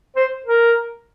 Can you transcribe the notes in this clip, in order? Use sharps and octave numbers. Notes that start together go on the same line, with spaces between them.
C5
A#4